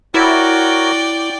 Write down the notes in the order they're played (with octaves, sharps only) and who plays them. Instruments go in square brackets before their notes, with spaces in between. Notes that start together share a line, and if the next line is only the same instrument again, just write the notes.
[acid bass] E4 [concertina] F#4 A#4 C#5 [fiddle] D5 G5